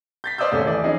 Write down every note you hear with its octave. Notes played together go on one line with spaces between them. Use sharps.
G6 A6 B6
C5 D5 D#6 E6 G6
D#1 A3 C#4 G4 D6
E3 A3 D5
E3 F3 C#4 D#4 G#4